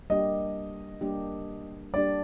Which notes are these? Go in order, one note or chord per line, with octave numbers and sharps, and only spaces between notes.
G3 A#3 D4 G4 D#5
G3 A#3 D4 G4
G3 A#3 D4 G4 D5